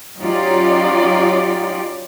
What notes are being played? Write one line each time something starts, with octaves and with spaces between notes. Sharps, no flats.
F#3 C#4 D#4 F4 G4 D5